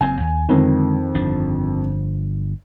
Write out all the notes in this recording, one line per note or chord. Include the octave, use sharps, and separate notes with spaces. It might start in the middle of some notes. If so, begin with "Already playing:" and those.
F#1 F#2 C4 G#5
D#2
F2 D3 D#3 G#3
G1 F3 D4